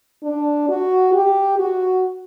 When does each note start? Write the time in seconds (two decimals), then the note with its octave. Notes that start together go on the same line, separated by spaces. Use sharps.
0.23 D4
0.69 F#4
1.14 G4
1.59 F#4